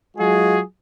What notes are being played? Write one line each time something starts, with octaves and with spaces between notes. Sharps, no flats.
F#3 G#3 F4 F#4 G#4